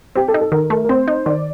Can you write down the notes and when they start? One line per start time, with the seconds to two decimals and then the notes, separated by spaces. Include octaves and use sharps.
0.15 C4 G4
0.28 A4
0.34 D#4
0.41 A4
0.52 D#3 A#4
0.70 A3 A#4
0.84 A#4
0.89 C4 C5
1.08 D#4
1.26 D#3 D5